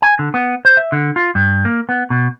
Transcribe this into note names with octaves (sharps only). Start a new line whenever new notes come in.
G#5
D3
B3
C5
E5
D3
F4
G2
A#3
B3
B2